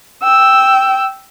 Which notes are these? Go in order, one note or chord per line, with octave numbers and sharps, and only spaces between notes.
G5 E6